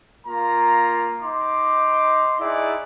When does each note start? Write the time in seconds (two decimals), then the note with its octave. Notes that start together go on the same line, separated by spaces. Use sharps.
0.27 A#3 F4 A#5
1.22 D#4 C6 D6
2.41 D#4 E4 G#4 D5 F#5